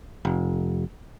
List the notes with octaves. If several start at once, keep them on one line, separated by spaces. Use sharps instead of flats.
F1